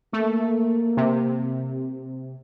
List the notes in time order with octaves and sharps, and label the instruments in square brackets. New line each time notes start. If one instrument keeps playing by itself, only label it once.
[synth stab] A3 [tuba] A#3
[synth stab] C3